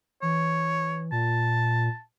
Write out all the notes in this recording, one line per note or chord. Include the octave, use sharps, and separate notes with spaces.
E3 C#5
A#2 A5